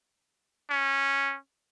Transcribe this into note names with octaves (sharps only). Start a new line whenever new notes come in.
C#4